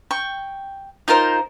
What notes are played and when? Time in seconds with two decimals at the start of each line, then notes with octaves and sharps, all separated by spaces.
0.11 G5 C#6
1.08 D#4 F4 A#4 C5